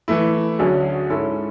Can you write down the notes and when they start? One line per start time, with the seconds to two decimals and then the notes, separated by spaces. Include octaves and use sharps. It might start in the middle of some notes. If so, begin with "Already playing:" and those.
0.08 E3 A3 E4
0.59 D2 D3 F#3 C#4 G#4
1.10 G#2 G#3 C#4 E4 A4